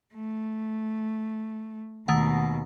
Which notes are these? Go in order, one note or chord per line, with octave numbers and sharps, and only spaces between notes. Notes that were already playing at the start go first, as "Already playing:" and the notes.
A3
D#2 B2 D#3 A3 F#5